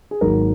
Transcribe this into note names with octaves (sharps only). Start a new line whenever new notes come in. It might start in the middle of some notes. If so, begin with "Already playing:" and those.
G#4
G#1 G#2 D#3 F#3 A#3 A#4